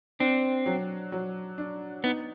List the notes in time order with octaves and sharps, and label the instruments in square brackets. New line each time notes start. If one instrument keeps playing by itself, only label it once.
[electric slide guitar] C4 [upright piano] D4
[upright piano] F#3
F#3
D4
[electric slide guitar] B3 [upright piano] D#4